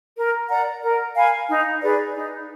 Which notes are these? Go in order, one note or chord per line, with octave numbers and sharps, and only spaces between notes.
A#4
D5 F#5 A#5
A#4
F5 G#5 B5
D#4
G#4 B4 D5
D#4